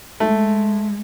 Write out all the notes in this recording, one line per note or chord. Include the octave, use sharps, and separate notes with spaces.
G#3 A3